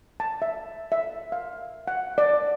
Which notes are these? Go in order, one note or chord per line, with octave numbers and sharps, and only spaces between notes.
A5
E5
E5
F5
F#5
D5